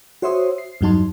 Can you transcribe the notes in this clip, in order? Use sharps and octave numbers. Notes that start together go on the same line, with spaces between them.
F#4 C5 C#5 E5 C6 D#6
C7
E2 G2 F#3 D#4 A5 C6